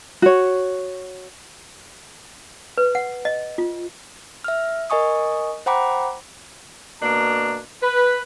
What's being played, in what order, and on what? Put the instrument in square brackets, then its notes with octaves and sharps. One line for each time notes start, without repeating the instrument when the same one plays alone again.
[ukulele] F#4 C#5
[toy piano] B4
F#5
D#5
F4
[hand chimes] E5 F6
A#4 D#5 G#5 C#6 D#6
C5 F#5 G5 A#5 B5 D6
[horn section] B2 A#3 D4 A#5
B4